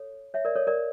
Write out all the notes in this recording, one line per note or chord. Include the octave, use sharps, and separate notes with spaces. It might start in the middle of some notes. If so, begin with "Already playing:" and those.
Already playing: A4 C#5
C#5 E5
A#4 D5
A4 C#5
A#4 D5